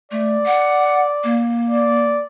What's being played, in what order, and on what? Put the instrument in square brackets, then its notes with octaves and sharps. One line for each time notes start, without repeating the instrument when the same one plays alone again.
[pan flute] A3 [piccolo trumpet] D5
[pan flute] F#5
A#3
[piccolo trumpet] D5